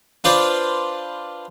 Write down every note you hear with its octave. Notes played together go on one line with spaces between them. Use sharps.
D4 F4 B4 C5 D5